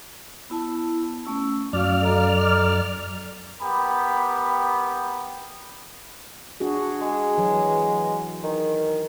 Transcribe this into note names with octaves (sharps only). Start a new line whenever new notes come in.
B3 E4 A5
A3 C#4 E6
F#2 C#4 F#4 D5 F5 F6
A4 D#5 A#5
B3 G4 A#4 B5
D4 F#4 G#4
G#3
E3 F#3
D#3